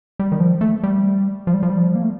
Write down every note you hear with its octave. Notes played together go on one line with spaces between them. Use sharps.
G3
D#3
F3
A3
G3
F3
G3
F3
G3
F3
A#3
A3